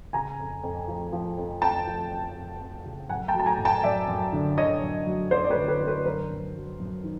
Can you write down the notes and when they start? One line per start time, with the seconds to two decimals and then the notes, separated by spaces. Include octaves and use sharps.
0.13 C#3 G#5 A#5
0.39 F2
0.63 F2
0.88 F3
1.12 F3
1.38 F2
1.61 F2 G5 A5
1.87 F3
2.11 F2
2.36 F2
2.60 F2
2.85 C#3
3.09 F#2 F#5 G#5
3.28 G5 A5
3.34 F#3
3.40 A5
3.46 G#5 A#5
3.59 F#2
3.65 G5 A5
3.83 F#2 D5 E5
4.08 F#2
4.33 D3
4.57 D3 C#5 D#5
4.82 F#2
5.06 F#3
5.31 F#2 C5 D5
5.44 D5
5.50 B4 C#5
5.56 D3
5.68 B4 C#5
5.81 D3
5.87 B4 C#5
6.05 F#2 A#4 C5
6.30 F#2
6.55 F#3
6.80 F#2
7.04 D#3